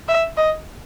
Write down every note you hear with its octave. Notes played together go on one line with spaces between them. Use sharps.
E5
D#5